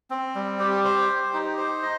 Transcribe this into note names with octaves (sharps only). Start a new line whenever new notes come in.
C4
G3
G4
C5
G4
D#4
C5
D#5